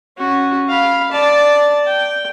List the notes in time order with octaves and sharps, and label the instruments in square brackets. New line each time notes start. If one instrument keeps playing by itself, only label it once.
[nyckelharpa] C#4 F#4
F5 B5
D5 A5
G5